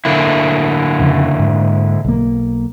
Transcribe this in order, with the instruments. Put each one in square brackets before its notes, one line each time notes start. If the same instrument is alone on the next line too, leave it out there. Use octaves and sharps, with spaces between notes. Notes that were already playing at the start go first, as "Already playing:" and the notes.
[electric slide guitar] D3 A#3 E4
[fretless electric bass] F2 C#3
G#2
B1 A#3